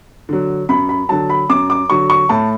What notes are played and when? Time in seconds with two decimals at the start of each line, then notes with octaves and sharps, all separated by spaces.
0.29 D3 F#3
0.69 F#2 B5
0.89 B5
1.09 D3 F#3 A5
1.30 B5
1.49 F#2 D6
1.70 D6
1.90 D3 F#3 C#6
2.10 C#6
2.29 A2 A5